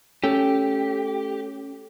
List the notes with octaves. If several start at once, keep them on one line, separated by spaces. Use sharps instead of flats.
A3 C#4 G4